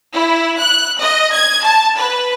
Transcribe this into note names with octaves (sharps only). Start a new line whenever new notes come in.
E4
F#6
D#5
G#6
A5
B4